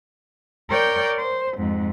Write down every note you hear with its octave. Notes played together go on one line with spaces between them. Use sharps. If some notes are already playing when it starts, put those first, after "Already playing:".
A#4 C#5 D5 G5 C6 G6
C5
F2 G#2